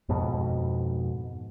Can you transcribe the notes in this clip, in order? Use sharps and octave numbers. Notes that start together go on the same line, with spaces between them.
F2 G#2 B2